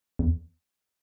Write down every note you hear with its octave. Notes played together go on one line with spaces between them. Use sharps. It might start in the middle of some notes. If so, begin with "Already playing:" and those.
E2